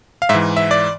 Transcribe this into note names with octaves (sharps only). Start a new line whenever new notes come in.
F5
G#2 E5
E3
E5
D5